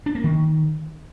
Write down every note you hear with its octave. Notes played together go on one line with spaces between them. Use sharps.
D4
A#3
D#3